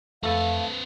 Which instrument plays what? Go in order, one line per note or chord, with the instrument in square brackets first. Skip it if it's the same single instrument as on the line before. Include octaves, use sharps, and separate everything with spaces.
[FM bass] F2 [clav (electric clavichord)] A3 A4 [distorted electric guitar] C4 B4 [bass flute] F5